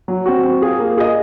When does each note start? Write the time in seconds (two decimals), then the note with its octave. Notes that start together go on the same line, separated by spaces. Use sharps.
0.08 F#3
0.26 C4 F#4
0.43 C4
0.61 F4 G#4
0.79 A#3
0.97 F4 G#4 D#5